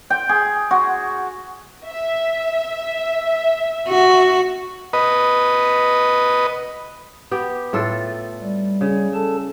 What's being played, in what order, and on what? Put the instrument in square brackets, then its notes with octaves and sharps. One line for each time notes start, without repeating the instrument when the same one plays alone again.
[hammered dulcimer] G5
G#4
F#4
[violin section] E5
[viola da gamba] F#4
[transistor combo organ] B4 D#5
[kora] B3 G4
A2 F4 A4
[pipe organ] G3
[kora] C#3
[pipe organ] A4 A5